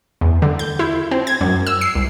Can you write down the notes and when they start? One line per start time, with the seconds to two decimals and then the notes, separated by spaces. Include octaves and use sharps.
0.21 E2
0.42 D3
0.59 G6
0.79 E4
1.11 C4
1.27 G#6
1.41 F#2
1.67 E6
1.81 C7
1.95 C2